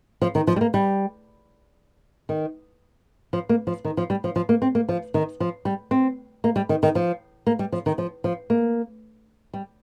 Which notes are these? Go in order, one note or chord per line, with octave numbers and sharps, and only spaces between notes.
F3
D#3
F3
G3
A#3
G3
D#3
F3
A#3
F3
D#3
F3
G3
F3
F3
A#3
C4
A#3
F3
D#3
F3
G3
C4
A#3
G3
D#3
D#3
F3
A#3
G3
F3
D#3
F3
F3
A#3
G3